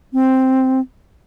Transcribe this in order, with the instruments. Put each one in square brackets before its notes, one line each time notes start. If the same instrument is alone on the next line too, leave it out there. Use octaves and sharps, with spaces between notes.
[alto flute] C4